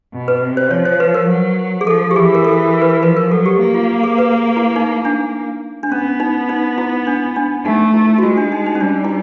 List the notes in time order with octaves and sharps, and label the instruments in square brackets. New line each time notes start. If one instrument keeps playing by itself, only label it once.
[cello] B2
[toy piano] B4
[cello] C3
[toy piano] C5
[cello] F3 [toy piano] C#5
[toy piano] C5
B4
A#4
[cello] F#3
[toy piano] G#4
[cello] F3 [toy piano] A4
[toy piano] G4
[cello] E3 [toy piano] G#4
[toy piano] A#4
A4
A#4
B4
A#4
[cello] F3 [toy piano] B4
[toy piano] A#4
[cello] F#3 [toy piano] A4
[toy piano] G4
[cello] A#3
[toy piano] F4
G#4
B4
E4
D#4
D4
D4
[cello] B3 [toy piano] C#4
[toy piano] D#4
D#4
E4
D4
D4
[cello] A3 [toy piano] D#4
[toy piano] E4
F#4
[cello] G#3 [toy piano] F4
[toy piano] D4
D#4
D#4
C#4
[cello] G3 [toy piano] D4
[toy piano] E4